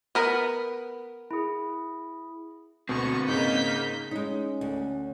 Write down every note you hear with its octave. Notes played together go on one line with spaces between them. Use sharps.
B3 A#4 B4
E4 G#4
D2 B2 C4 B4 C#6
G#2 C#3 A#3 D#4 G6 B6
G#3 C#4 D#4
D2